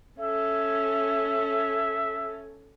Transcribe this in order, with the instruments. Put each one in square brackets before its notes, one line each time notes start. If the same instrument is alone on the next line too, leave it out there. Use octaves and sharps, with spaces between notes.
[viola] C#4 A4 [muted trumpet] E5